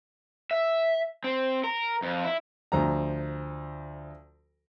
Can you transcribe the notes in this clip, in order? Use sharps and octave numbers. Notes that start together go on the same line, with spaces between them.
E5
C4
A#4
F2
E4
D2 F3 A#5